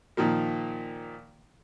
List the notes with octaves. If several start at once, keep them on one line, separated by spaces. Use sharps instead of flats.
A#2 D#3 F3 A#3